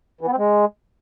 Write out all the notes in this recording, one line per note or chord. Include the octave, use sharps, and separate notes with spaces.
E3
B3
C4
G#3